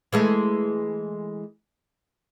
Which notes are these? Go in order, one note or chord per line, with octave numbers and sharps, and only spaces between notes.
E3 G#3 A3